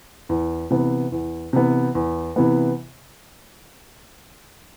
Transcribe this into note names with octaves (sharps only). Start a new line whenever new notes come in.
E2
C3 E3 B3
E2
C3 E3 B3
E2
C3 E3 B3